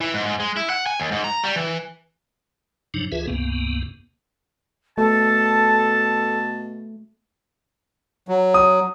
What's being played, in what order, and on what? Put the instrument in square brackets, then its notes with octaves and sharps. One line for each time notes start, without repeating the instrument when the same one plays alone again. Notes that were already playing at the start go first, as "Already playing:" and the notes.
[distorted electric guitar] E3
G#2
G#2
G#3
E4
F#5
G#5
D#2
G#2
A#5
G3
E3
[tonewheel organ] G2 C3 F3 F#3 D4 D#4
D2 E3 F4 G#4 B4 E5
C#2 G2 C3 A#3 B3
[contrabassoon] B2 [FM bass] A3 [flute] A4 [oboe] A5
[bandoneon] F#3
[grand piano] D#6